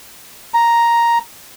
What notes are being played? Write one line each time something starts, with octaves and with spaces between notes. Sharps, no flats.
A#5